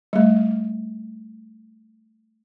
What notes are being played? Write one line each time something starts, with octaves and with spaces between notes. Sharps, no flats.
G3 A3